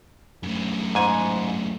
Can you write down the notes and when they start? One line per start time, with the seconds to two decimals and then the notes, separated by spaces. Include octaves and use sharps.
0.43 F#2 A2
0.95 G#2 G#5